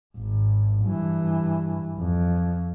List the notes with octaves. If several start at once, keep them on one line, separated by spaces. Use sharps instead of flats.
G#1
G2 E3
F2